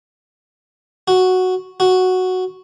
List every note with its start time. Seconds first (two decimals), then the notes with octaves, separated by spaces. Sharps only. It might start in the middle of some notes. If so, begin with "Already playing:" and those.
1.08 F#4
1.80 F#4